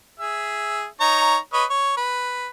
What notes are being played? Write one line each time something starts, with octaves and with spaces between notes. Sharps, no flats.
G#4 E5
D#4 C#5 A#5
B4 C#5 D#5
C#5
B4